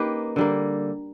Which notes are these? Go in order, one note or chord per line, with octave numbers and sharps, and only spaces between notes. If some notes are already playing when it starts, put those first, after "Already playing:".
Already playing: A#3 C#4 D#4 G4 B4
D3 G3 A#3